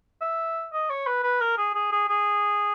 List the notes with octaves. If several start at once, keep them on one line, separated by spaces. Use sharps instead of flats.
E5
D#5
C#5
B4
B4
A#4
G#4
G#4
G#4
G#4